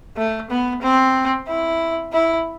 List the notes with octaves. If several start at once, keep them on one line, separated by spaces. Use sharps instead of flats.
A3
B3
C4
E4
E4